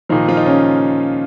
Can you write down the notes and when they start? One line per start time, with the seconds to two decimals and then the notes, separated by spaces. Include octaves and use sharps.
0.09 A#2 D#3 F3 D#4
0.28 F3 F4
0.37 D#4
0.46 C#3 C#4